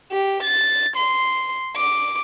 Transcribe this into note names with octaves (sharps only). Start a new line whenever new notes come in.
G4
A6
C6
D6